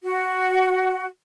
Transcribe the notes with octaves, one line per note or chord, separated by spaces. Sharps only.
F#4